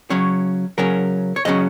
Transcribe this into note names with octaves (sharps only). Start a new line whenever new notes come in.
C#3 F#3 C#4 C#5
C#3 F#3 C#4 A#4
C#5
C#3 F#3 C#4 D#5